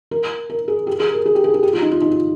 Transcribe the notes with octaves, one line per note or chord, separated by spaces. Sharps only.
A#4
A#4
G#4
G4
G#4
A#4
G#4
G4
G#4
G#4
G4
F4
D#4
F4
D#4
F4